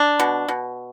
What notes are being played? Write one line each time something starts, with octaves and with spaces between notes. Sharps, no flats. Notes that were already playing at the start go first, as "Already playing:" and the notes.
Already playing: D4
B2
B2